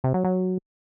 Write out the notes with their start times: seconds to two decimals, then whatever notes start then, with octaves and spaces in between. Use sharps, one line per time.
0.04 C3
0.14 F#3
0.25 F#3